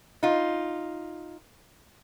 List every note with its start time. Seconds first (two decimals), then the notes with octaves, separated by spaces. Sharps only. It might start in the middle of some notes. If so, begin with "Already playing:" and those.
0.23 D#4 F4